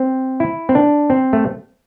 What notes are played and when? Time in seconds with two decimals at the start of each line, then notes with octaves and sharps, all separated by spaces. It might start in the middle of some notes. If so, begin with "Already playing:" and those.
Already playing: C4
0.40 E4
0.69 C4
0.75 D4
1.10 C4
1.33 A3